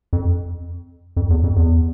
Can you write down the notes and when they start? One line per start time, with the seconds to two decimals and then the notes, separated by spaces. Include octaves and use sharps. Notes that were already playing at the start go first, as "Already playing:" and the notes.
0.13 F2
1.16 F2
1.30 E2
1.44 F2
1.56 E2